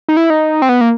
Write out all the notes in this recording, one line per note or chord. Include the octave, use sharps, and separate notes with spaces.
D#4
E4
D#4
C4
B3
A#3